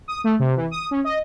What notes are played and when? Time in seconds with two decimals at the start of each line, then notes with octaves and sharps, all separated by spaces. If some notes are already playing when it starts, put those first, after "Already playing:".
0.08 D#6
0.24 A3
0.40 C3
0.56 E3
0.71 D#6
0.91 C#4
1.04 D#5